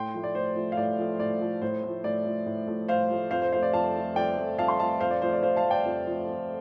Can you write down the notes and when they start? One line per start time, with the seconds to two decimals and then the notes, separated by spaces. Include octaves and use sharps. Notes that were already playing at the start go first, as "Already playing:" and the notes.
Already playing: A2 G5 C6
0.14 F3 A3
0.24 D5
0.35 A2 C5
0.56 F3 A3
0.72 F5
0.77 A2 D5
0.99 F3 A3
1.19 A2 D5
1.41 F3 A3
1.62 A2 C5
1.83 F3 A3
2.04 A2 D5
2.25 F3 A3
2.46 A2
2.67 F3 A3
2.88 A2 C5 F5
3.10 F3 A3
3.31 F2 C5 F5
3.42 C5
3.53 F3 A3 C5 F5
3.63 D5
3.73 F2 F5 A5
3.94 F3 A3
4.16 F2 D5 G5
4.37 F3 A3
4.58 F2 F5 A5
4.68 C6
4.79 F3 A3 F5 A5
5.00 F2 C5 F5
5.11 D5
5.22 F3 A3 C5
5.33 D5
5.42 F2 C5 F5
5.56 F5 A5
5.64 F3 A3
5.71 D5 G5
5.85 F2
6.07 F3 A3
6.27 F2